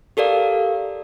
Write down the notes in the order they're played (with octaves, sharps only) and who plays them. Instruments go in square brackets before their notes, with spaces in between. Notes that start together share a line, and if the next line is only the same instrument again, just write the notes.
[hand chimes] G4 A4 A#4 D5 F5